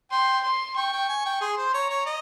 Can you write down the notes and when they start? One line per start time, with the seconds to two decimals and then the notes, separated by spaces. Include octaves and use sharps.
0.11 G5 C6
0.44 C6
0.76 G5 C#6
0.92 G5
1.09 G#5
1.25 G5
1.41 G#4 C6
1.57 C5
1.73 C#5 A#5
1.90 C#5
2.06 D#5